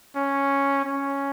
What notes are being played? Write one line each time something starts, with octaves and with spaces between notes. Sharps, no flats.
C#4
C#4